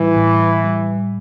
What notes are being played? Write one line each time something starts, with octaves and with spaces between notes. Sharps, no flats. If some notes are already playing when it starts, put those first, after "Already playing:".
Already playing: A2 E3 G3
A2
G3